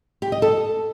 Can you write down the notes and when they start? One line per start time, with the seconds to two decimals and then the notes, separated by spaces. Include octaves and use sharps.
0.22 G4
0.32 D#5
0.42 A4